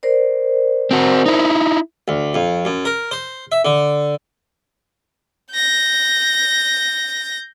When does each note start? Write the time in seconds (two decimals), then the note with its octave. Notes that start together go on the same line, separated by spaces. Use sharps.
0.03 A#4 C5 D5
0.91 C4 F#4
1.26 D#4 E4
2.08 D2
2.34 F2
2.65 F#2
2.85 A#4
3.11 C5
3.52 E5
3.65 D3
5.53 G6 A#6